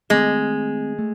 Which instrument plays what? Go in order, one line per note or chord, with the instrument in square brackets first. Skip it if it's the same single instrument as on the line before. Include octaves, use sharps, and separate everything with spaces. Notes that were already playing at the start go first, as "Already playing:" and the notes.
[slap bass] D#3 A3 C4 [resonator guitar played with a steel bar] G#3
[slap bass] A3